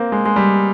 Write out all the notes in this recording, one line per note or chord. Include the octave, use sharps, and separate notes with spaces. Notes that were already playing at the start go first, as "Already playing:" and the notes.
Already playing: A#3 C4
G#3
G#3
G3